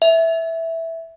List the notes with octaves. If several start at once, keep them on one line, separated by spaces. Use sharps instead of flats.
E5